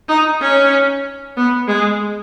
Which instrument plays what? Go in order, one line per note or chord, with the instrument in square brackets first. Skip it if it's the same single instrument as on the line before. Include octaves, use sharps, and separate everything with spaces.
[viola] D#4
C#4
B3
G#3